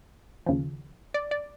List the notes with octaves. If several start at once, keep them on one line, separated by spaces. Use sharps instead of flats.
D#2 C#3 F3
D5
D5